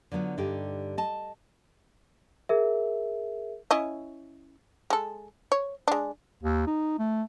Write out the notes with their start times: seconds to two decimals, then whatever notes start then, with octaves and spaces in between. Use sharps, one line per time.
0.12 D3 F#3 B3 F4
0.38 G2 D3 D#4 G4
0.97 D#5 A5
2.49 G#4 A#4 E5
3.71 C#4 E4 D#5
4.90 G#3 A4
5.52 C#5
5.88 G#3 D4
6.43 D#2
6.67 D#4
6.99 A3